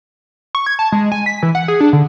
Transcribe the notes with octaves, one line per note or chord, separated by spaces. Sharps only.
C#6
G#6
A5
G#3
G#5
B6
E3
F#5
G#4
D4
D3